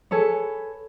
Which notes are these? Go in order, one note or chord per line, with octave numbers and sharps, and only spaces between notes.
G#4 A4 B4 C#5